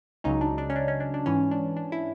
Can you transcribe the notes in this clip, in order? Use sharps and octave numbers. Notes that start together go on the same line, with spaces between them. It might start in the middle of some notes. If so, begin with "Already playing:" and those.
C#2 C#3 F#3 C#4 D#4
D4
D4
C#4
D4
C#4
D4
D4
G#2 E3 C#4
D4
D4
E4